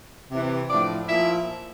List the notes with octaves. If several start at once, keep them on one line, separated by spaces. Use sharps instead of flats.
C3 E3
A2 F3 D4 D5
A#2 F3 E4 E5